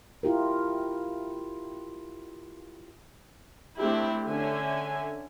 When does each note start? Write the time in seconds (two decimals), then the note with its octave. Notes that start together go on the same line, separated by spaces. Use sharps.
0.23 E4 F4 G4 A#4
3.78 A3 C4 D4 E4 G4
4.27 D3 C#4 E5 G#5